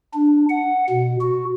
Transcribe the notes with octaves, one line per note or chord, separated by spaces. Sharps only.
D4
F#5
B2
F#4